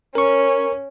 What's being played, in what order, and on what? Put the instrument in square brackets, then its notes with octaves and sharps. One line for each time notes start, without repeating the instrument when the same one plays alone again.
[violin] C#4 [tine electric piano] A#4 C#6